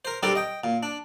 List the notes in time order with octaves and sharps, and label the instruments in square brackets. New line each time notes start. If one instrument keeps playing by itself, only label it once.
[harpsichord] A#4 C5
G3 C4 D4 G4 A4 A#4
D#5 G5
A#2
D4